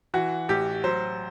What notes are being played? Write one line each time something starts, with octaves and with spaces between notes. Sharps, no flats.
E3 F#4
A1 G4
F#3 C5